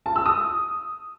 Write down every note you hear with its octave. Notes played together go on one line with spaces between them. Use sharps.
A5
E6
D#6